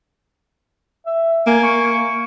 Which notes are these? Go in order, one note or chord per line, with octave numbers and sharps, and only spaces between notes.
E5
A#3 G#5
C#6